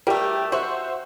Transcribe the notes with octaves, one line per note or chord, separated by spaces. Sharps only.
G3 A3 G4 A#4
F#4 C5 E5